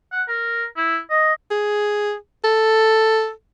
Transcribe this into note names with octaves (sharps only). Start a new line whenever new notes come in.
F#5
A#4
E4
D#5
G#4
A4